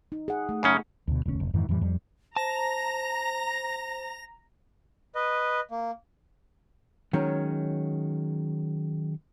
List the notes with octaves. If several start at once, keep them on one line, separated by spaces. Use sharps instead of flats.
D#4
G#4 F#5
A3
F#2 C#3 C#4
D2 B2
E1 D2 D3 C#4
F1
F2 G#2 D#3 E3
F2 A2 E3 G3
F2 G3
C5 A5 A#5 A#6
B4 D#5
A#3
D#3 F#3 G#3 C#4